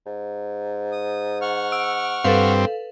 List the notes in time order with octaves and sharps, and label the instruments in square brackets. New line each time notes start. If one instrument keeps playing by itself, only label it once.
[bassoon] G#2
[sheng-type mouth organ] D#6
F#5 C#6 F6
[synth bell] E6 D7
[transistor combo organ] G2 C4 [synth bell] A4 B4 F5